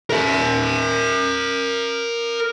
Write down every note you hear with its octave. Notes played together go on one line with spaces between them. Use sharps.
A#4 E5